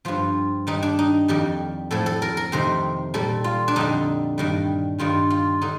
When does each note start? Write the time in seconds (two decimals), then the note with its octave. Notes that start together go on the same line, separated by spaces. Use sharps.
0.05 G2 F3 F4
0.67 G2 D#3 G3 D#4
0.83 D4
0.99 D#4
1.28 F2 D#3 G3 G4
1.91 A2 F3 A4
2.06 A4
2.22 A#4
2.37 A#4
2.52 F2 C3 D#3 C5
3.14 A#2 G3 A4
3.44 F4
3.68 D4
3.76 F2 D3 G3 D#4
4.38 G2 D#3 G3
4.98 G2 D#3 G3 F4
5.30 F4
5.61 D3 D#4